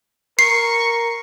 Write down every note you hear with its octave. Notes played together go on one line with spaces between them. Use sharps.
A#4 C#6 C7